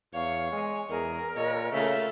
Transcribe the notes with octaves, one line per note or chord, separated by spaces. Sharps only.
E2 C#5 F5 C#6
G#3 G#5
E2 G#4 A#4
A#2 C#5 D#5
C#3 A3 F4 E5